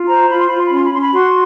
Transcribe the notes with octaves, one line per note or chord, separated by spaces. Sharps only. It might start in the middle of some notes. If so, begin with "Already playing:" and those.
Already playing: F4
C5 A#5
F4 B5
C6
F4 B5
C6
B5
C#4 C6
B5
C#4 C6
B5
F#4 C6